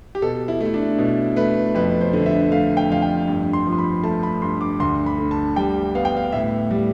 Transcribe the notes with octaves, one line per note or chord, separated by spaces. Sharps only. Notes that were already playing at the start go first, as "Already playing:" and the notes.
G4
B2 A4
E4
A3 E4
D4
B2
A3 B4
F2 B4
C5
D3
E5
A3 F5
G5
F2 F5
G5
G2
C6
F3
C6
B5
A3 A5
B5
G2 C6
D6
D2 C6
B5
D3
A5
G3 G5
B3 F5
G5
F5
A2 E5
G3